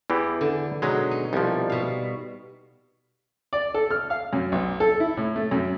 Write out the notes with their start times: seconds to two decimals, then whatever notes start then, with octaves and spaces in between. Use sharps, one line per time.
0.10 E2 E3 G4
0.41 D3
0.82 B2 F#3 G#3 D#4
1.11 D#4
1.33 C2 F3 G3
1.70 B2 F5
3.53 D5
3.74 A4
3.91 F6
4.10 F5
4.33 F#2
4.52 B1
4.80 A4
5.00 E4
5.17 A2
5.36 A3
5.51 F#2